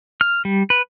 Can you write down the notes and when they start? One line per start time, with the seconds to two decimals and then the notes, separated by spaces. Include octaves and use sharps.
0.21 F6
0.45 G3
0.70 B4